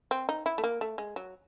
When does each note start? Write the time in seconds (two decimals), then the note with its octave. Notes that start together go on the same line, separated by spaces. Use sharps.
0.11 C4
0.29 D#4
0.46 E4
0.58 A3
0.64 A#3
0.81 A3
0.98 G#3
1.16 F#3